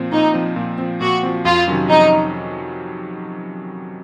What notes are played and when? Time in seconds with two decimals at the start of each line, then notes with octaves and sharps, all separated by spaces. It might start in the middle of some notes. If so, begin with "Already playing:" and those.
Already playing: A#2 F3 C4
0.12 A#2 D#4
0.34 F3 C4
0.56 A#2
0.78 F3 C4
1.01 A#2 F#4
1.23 F3 C4
1.45 F2 F4
1.68 C3 D#3 F#3 C#4
1.89 F2 D#4